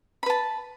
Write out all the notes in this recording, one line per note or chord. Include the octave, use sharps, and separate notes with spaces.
B4 A5 B5